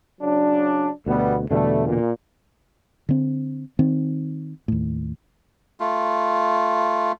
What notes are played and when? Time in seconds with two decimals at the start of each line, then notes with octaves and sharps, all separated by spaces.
0.21 C#3 F#3 D4
1.06 D2 B2 G3 A3 B3
1.51 E2 B2 D3 G3 A3
1.86 A#2
3.09 D3 C4
3.79 D#3 C4
4.68 D#2 A2
5.80 A3 F4